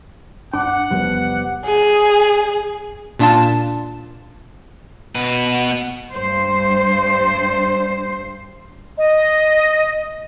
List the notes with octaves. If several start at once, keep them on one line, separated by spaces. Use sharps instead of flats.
G2 D4 F#5 D6
E2 C3 F3 G3 B3
G#4
A#2 D4 F4 A5
B2 B4
G2 C5
D#5